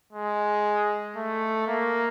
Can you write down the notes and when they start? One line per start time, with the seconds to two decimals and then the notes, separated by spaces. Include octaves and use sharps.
0.13 G#3
1.16 A3
1.67 A#3